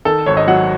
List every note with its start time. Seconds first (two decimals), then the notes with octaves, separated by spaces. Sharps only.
0.05 D#3 A4
0.26 G#1 C#5
0.37 D#5
0.48 F#3 F#5